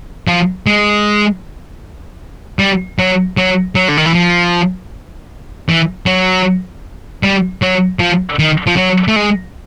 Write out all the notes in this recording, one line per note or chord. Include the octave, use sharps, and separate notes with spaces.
F3
G#3
G3
F#3
F#3
F#3
D3
D#3
E3
F3
E3
F#3
G3
F#3
F3
D#3
F3
F#3
A3
G#3